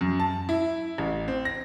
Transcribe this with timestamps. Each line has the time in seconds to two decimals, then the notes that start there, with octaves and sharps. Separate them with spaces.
0.01 F#2
0.20 A5
0.49 E4
0.98 A1
1.28 C4
1.45 A#6